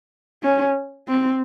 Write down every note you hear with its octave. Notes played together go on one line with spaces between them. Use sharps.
C#4
C4